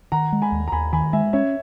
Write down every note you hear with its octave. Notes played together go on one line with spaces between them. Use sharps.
D#3 F#5 A#5
G#3
G#5 B5
D#2
A#5
D#2 G#5 B5
D#3 G#5 B5
G#3 E5 G#5
C#4 C#5 E5